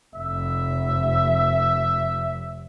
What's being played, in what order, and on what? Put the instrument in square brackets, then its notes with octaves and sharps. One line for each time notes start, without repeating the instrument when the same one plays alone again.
[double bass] F1 [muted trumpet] E5